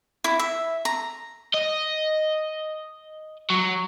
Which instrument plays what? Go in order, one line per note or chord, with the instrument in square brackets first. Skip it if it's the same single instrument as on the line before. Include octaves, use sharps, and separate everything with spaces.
[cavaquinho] E4
E5
A#5
[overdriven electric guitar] D#5
F#3